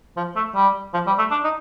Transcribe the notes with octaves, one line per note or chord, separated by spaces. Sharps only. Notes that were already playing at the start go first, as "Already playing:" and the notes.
F3
A3
G3
F3
G3
A3
D4
D#4